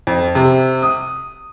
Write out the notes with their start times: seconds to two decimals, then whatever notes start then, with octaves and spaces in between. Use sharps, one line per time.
0.07 F2
0.35 C3
0.82 D#6